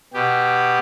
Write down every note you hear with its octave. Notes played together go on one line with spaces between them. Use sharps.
B2 G4